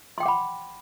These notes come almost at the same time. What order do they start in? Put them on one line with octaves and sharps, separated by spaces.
C6 G5 D6 F#5 B5